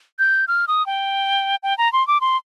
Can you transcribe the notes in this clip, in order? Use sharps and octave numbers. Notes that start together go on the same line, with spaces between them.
G6
F6
D#6
G5
G5
A#5
C6
D6
C6